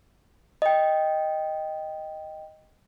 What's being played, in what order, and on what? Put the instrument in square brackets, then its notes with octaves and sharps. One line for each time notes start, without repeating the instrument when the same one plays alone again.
[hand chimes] D#5 G5